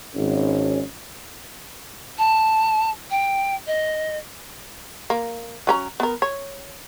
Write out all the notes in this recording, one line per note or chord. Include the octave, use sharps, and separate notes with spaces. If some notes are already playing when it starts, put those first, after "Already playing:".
G#1 C#4
A5
G5
D#5
A#3
F#3 C#4 A#5
B3 A#4
C#5